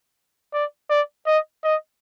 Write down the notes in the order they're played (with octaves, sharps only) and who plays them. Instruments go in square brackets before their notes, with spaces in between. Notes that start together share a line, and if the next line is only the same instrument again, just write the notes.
[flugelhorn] D5
D5
D#5
D#5